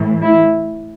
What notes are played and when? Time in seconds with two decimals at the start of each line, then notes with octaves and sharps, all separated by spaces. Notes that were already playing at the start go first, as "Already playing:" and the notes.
Already playing: A2 E3
0.22 E4